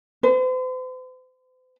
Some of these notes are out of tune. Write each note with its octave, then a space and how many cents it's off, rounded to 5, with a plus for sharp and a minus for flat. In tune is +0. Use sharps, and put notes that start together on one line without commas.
C5 -45